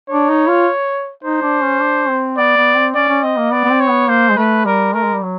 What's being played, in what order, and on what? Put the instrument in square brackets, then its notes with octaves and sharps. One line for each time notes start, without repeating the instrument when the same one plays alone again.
[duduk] D4 [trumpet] C#5
[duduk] D#4
F4
[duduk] D#4 [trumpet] C5
[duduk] D4
C#4
D4
C4
[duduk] B3 [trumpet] D5
[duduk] B3
C4
[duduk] C#4 [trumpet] D5
[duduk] C#4
[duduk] C4 [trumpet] D#5
[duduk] A#3
[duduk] B3 [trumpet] D5
[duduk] B3
C4
[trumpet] C#5
[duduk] B3
[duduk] A#3 [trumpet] C5
[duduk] G#3
[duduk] A3 [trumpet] B4
[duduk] G3 [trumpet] A#4
[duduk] A3 [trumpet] A#4
[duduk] G#3
G3
F#3